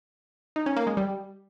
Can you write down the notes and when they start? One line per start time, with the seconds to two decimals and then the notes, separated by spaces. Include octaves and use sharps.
0.56 D#4
0.66 C#4
0.76 A#3
0.87 G#3
0.97 G3